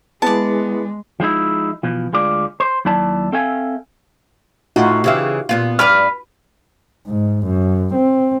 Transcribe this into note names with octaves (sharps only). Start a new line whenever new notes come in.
G#3 B3 E4 G#4 B4 D5 A5
F3 G#3 D#4 E4
B2 E3 F3
D2 G#3 F4 D5
C5
D#2 F#3 E4 D5 A5
C4 A4 E5 F5 G#5
A2 D#4 F4 F#4
C#3 E3 G4 E5 F5
A#2 B3 F4
G2 B4 D5 F6
G#2
F#2
C4